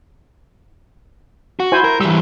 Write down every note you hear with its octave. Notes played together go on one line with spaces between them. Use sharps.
F#4
E4 C5 G#5
A#4
E3 G3 E6